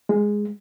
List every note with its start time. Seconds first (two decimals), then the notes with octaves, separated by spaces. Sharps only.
0.09 G#3